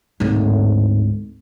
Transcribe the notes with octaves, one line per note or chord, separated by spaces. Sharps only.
D1 G#2